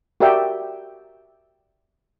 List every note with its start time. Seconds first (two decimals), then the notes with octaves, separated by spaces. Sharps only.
0.20 F#4 G4 A#4 D5 E5 G5